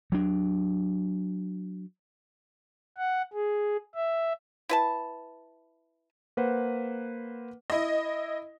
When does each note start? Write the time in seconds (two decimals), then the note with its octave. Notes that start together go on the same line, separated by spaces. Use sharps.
0.12 F#3 D4
2.97 F#5
3.33 G#4
3.95 E5
4.69 E4 B4 A5
6.37 A#3 B4 C5 F#5
7.70 E4 D#5